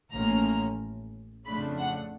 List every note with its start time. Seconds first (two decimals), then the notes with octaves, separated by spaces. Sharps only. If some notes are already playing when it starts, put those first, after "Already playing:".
0.10 A1 A2 F3 A#3 C#4 A#5
1.45 F2 C#3 F3 A3 D4 B5
1.78 F#5